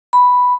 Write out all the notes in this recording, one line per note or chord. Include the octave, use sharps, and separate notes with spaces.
B5